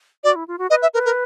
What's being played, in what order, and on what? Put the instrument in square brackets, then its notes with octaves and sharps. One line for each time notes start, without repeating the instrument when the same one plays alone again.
[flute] F#4 [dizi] D5
[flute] E4
F4
F#4
[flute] B4 [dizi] D#5
[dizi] E5
[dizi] A#4 [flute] B4
[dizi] A#4